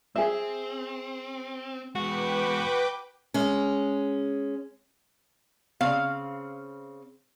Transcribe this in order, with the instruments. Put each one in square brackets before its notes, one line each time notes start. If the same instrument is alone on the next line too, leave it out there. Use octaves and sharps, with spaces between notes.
[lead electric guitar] C4 [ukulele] G#4 E5
[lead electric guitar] E2 G#3 [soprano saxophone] F#4 [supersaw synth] B4 G5 D6
[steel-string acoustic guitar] G#3 C#4
[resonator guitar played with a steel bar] C#3 C4 F5